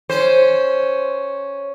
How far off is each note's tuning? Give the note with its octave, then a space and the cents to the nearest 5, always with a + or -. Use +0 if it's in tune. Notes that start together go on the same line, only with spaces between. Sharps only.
C#4 +0 C5 +0